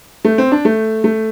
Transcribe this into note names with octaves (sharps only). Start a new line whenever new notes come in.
A3
C4
D4
A3
A3